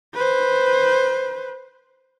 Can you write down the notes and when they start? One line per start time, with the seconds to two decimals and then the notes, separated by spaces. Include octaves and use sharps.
0.14 B4 C5